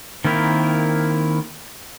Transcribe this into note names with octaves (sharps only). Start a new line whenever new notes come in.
D#3 A#3 C4 E4 A#4